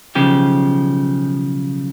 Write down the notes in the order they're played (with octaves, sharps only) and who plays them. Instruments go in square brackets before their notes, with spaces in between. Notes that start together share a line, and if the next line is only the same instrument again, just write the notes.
[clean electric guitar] B1 C#3 F3 G4